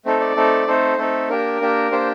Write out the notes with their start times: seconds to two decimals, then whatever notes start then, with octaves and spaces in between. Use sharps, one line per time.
0.05 A3 C4 D#4 A4
0.21 D5
0.36 A3 C4 D#4 A4
0.67 A3 C4 D#4 A4 C5
0.98 A3 C4 D#4 A4
1.29 A#3 D4 G4 A#4
1.60 A#3 D4 G4
1.91 A#3 D4 G4 C5